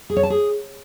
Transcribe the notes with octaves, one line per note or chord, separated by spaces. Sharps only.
G#4
C#5
A5
G#4